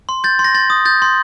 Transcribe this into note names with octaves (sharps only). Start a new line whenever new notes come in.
C6
G6 A6
C6
A#6
C6 A6
D#6
G6 A6
C6